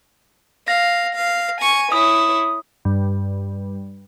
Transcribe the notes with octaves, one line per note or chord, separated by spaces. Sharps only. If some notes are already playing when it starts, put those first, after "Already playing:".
F5 A#6
F5
G#5 C#6
E4 C#5 D#6
G2